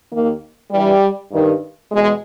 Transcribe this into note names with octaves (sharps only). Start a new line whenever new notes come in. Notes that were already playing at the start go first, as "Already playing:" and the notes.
D#2 D#3 A#3
G2 E3 G3
G2 D#3
E2 B2 G#3